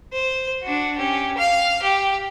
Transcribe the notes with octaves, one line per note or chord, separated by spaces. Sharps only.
C5
D4 F#4
C#4 G4
F5 F6
G4